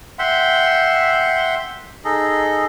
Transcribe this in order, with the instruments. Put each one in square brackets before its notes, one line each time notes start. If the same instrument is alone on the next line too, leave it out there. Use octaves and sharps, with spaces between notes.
[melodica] E5 F#5 G5 C6
D#4 G#4 A4 D#5